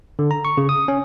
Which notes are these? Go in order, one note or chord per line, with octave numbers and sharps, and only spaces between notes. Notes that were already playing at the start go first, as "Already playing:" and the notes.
D3
A#5
C#6
C#3
D#6
C#4